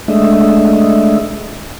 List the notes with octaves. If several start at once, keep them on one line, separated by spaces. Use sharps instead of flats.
G#3 A3 D4 D#5 E5